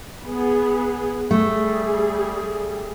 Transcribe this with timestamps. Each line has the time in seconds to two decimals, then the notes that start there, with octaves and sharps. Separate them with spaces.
0.24 B3 G#4
1.31 G3 A3 G#4